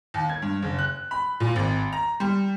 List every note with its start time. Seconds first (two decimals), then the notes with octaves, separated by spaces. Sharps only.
0.14 D#2
0.29 G#6
0.42 G2
0.62 F#1
0.79 F#6
1.11 B5
1.40 A#2
1.56 G#1
1.93 A#5
2.20 G3